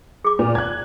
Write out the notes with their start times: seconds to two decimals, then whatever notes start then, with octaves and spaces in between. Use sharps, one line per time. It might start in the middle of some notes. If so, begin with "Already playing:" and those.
0.25 G#4 D6
0.39 A#2
0.55 F#6 G#6